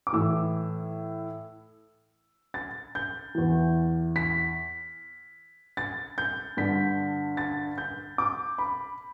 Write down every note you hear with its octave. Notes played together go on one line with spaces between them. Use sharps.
D6
A2 E3 E6
A6
G6
E2 E3
B6
A6
G6
G2 D3 B6
A6
G6
D6
B5